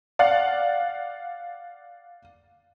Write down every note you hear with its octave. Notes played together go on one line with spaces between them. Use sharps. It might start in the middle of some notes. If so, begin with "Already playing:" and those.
D5 F5 F#5